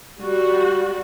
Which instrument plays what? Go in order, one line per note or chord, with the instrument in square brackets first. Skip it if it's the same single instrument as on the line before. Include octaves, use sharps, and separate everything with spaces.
[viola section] G3 F#4